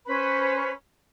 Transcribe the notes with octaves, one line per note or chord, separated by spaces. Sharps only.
C#4 B4 C5 B5